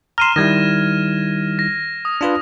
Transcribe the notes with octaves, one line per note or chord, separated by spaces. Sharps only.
A#5 C6 F6 D#7 E7
D#3 G3 E4 G#6 A#6
A#6
D#6
D4 F4 B4